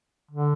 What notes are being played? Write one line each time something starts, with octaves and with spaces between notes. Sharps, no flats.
D3